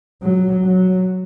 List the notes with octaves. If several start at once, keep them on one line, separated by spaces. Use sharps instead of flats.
F#3
F#3